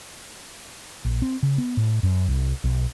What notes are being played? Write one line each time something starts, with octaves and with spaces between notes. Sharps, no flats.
A#1
C4
C#3
B3
A2
F#2
C2
B1